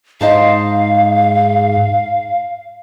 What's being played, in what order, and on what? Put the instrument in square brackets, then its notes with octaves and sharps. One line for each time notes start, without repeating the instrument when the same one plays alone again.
[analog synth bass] G#2 [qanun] D#4 C5 A5 [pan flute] F5